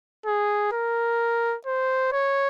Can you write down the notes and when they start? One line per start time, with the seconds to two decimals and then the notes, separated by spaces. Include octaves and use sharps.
0.26 G#4
0.72 A#4
1.66 C5
2.12 C#5